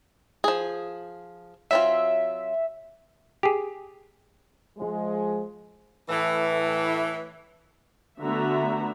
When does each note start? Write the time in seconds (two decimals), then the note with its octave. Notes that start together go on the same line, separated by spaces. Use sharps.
0.44 F3 G#4
1.71 F#3 C4 F4 E5
3.43 G4 G#4
4.77 F3 G#3
6.09 A2 E3
8.21 D3 A3 B3 F#4 E5 A#5